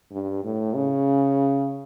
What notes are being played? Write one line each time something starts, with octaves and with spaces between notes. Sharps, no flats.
G2
A2
C#3